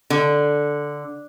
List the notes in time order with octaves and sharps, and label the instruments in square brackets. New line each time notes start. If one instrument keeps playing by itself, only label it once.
[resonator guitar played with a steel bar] D3